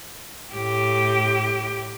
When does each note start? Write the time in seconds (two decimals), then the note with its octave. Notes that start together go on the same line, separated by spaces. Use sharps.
0.52 A2 G4